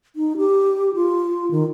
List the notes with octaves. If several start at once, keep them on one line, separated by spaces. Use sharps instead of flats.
D#4
G4
F4
D#3